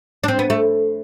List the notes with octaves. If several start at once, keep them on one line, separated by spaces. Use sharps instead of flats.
D4
C4
B3
A3